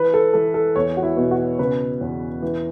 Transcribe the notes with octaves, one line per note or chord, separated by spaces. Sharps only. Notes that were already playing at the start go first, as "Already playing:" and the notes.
Already playing: E3 B4
A4
E3 A4
A4
E2 C#5
F#4
E4
B2
F#4
C#3 B4
E2
E3